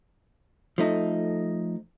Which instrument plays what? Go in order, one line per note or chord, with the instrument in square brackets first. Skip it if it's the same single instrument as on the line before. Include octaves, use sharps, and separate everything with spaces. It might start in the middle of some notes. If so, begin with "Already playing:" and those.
[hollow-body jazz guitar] F3 A3 D#4 A4